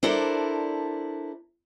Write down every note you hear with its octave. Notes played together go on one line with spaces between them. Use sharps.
D4 E4 A4 A#4 C5 D5